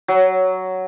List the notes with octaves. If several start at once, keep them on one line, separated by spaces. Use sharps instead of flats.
F#3